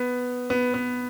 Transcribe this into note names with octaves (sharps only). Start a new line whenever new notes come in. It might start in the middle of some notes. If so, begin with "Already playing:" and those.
Already playing: B3
B3
B3